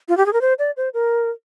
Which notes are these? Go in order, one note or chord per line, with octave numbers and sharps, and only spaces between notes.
F4
G4
G#4
A#4
C5
D5
C5
A#4